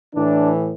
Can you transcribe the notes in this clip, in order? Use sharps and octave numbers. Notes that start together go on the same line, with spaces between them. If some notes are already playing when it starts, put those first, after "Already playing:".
A2 E3 D4